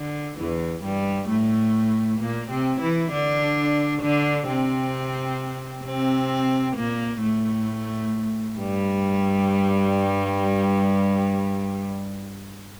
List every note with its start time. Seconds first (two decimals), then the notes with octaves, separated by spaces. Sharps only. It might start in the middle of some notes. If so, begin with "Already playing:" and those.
Already playing: D3
0.38 E2 E3
0.84 G2 G3
1.29 A2 A3
2.20 A#2 A#3
2.50 C3 C4
2.81 E3 E4
3.11 D3 D4
4.02 D3 D4
4.48 C3 C4
5.85 C3 C4
6.76 A#2 A#3
7.21 A2 A3
8.59 G2 G3